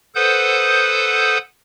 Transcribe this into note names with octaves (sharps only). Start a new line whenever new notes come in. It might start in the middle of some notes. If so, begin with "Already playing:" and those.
A4 B4 C5 F#5 D#6 G6